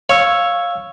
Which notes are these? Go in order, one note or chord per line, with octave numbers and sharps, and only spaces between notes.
C#5 F5 E6